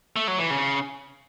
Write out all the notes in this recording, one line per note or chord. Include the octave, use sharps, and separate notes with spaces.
A3
F#3
E3
C#3